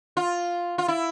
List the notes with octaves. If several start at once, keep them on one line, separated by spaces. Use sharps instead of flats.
F4
F4
E4